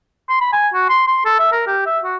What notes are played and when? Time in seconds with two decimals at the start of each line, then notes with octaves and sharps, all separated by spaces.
0.29 C6
0.41 B5
0.53 G#5
0.74 F#4
0.89 C6
1.07 C6
1.25 A4
1.39 E5
1.52 A#4
1.67 G4
1.86 E5
2.04 F#4